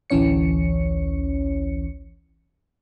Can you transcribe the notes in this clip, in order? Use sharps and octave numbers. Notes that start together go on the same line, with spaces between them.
A1 D2 E3 C#4 C#5 C#7